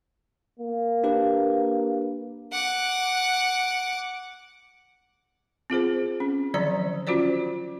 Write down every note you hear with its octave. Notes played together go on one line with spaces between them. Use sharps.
A#3
D4 G4 B4
F#5 D6
C4 F4 G#4 C5
C#4
D3 D#3 F3 F#3 D5 A#5
C#4 F4 F#4 C5 D5